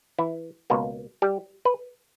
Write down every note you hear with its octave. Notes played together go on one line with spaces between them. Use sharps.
E3 E4
C#2 B2 A#3
G3 G4
B4